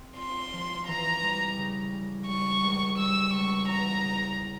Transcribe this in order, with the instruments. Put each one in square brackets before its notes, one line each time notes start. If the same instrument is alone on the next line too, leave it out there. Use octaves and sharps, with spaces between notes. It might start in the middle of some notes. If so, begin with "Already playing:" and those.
Already playing: [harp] C4
[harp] F4 [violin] C6
[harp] F3
[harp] E3 [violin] A#5
[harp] G3
C#3
G3
[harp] G3 [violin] C#6
[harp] C#2
[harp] G3 [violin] E6
[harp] C#2 [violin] C#6
[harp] E2 [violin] A#5
[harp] C#3